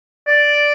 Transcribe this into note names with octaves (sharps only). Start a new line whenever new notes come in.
D5